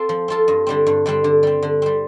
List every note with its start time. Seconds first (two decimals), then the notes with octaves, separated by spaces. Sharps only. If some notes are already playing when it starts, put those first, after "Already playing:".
Already playing: C4 F4 A4
0.09 F3
0.28 C4 F4 A4
0.48 G2
0.67 D3 G3 C4
0.86 G2
1.06 D3 G3 C4
1.24 D3
1.43 G3 C4
1.63 D3
1.82 G3 C4